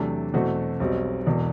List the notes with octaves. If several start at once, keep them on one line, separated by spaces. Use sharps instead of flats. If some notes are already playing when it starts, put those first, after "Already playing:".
Already playing: E2 C3 F#3 A3 D4
E2 B2 A3 C4 F#4
B1 B2 G3 C4
E1 E2 B2